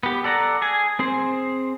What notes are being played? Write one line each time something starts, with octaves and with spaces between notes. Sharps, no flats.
B3 G4
A4 D5 F#5 A#5
G#4 G#5
C4 G#4 C5